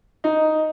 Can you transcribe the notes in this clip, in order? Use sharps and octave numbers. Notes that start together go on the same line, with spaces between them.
D#4